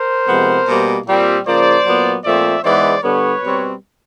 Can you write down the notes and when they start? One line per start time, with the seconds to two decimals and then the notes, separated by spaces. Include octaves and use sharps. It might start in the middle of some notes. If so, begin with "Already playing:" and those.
Already playing: A#4 C5
0.28 C3 F3 G#3 B3
0.67 B2 G3 A#3
1.06 A#2 G3 C4
1.46 C#3 F3 A#3 C5 D5
1.85 A#2 F#3 B3
2.24 A#2 F3 A3 C4 D5 E5
2.63 G#2 E3 G#3 B3 C5 D5
3.02 D3 G3 B3 B4 C#5
3.42 B2 G3 C4